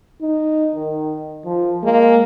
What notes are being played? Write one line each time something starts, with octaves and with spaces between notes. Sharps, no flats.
D#4
D#3
F3
G#3 A#3